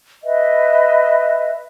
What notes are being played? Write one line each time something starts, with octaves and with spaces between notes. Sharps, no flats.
B4 D#5 E5